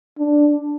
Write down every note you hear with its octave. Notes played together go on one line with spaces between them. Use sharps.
D4